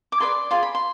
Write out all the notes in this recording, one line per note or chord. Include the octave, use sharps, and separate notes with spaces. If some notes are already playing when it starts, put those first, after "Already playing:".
D6
G#4 B4 D5 C6
F4 G#4 D5 C6
B5
C6